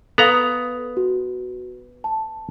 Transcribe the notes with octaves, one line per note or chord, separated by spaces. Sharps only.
B3 A4 F5 A#5 D#6
F#4
A5